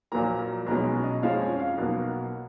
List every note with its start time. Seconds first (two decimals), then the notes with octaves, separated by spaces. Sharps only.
0.12 A#1 A#2 F#3 A#3 A#5
0.67 B1 B2 G#3 C#4 A#5
1.03 D#5
1.22 F2 F3 G#3 C#4 F5
1.41 C#5
1.60 F5
1.78 B1 B2 A#3 F#5